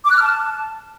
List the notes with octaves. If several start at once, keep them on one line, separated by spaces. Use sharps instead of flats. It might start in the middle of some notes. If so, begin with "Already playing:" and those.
D6
F#6
F6
A5